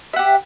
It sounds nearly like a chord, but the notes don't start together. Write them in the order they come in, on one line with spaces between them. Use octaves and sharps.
E5 F#5 G4